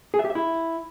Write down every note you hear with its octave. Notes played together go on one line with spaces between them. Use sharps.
G#4
E5
G4
E5
E4